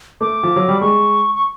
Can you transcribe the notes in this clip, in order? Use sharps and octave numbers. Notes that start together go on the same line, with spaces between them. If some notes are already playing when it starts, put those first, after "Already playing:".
A3 D6
F3
F#3
G3
G#3 C#6
C#6